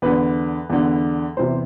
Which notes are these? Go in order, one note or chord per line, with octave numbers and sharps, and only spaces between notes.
E2 D3 B4
E2 D3
E2 C3 E3 C5